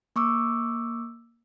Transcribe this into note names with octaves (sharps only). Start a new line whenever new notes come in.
A#3 C#6 D6 E6